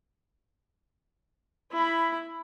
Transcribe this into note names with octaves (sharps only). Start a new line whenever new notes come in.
E4 B5